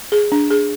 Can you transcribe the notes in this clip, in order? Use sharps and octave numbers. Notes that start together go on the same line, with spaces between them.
G#4
D4
G#4